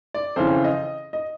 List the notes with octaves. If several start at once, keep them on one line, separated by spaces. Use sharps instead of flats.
D5
F2 C#3 E3 C5
D#5
D#5